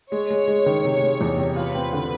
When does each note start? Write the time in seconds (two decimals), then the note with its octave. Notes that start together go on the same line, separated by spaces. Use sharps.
0.12 G#3 C#5
0.30 G#3
0.48 G#3
0.66 D#3
0.84 C3
1.02 G#3
1.21 E2
1.38 C3
1.56 F4 B4
1.75 C4
1.93 D3